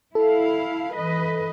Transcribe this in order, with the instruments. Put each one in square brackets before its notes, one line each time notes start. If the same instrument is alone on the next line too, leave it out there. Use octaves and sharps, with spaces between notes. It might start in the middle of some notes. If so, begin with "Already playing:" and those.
[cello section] E4 F5 [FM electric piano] A4
[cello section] E3 B4 D#5